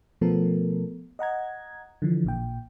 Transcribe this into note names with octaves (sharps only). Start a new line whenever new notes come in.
B2 F3 A3 B3 A4 A#4
D#5 F#5 A#5 G#6
D3 E3 F3
A1 A#2 G5